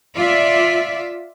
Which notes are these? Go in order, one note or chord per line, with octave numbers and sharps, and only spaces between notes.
F4 D5 E5